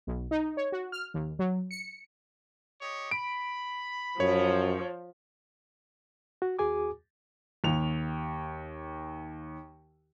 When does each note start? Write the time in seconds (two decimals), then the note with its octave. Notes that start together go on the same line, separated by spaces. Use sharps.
0.07 B1
0.31 D#4
0.57 C#5
0.72 F#4
0.92 F6
1.14 D#2
1.39 F#3
1.71 C#7
2.81 G4 C#5 D#5
3.11 B5 D7
4.20 F#2 F3 C#5
6.42 F#4
6.59 D#2 F#4 G#4 G#5 D6
7.64 D#2 F7